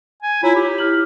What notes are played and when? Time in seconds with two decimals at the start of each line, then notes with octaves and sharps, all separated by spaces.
0.22 G#5
0.43 E4 F4 C#5 A#5
0.55 G4
0.78 E4 F6 F#7